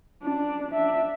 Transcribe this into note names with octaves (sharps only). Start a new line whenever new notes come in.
D4
D4 E5